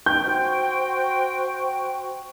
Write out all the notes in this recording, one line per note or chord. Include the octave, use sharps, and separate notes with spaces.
D#4 G5 G6
F#4 C5 C#6